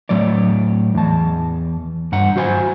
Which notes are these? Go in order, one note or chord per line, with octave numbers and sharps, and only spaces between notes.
A2 F#3 C#5 D5
E2 A5
G2 F#5
F#3 F#4 C5 F#5 G#5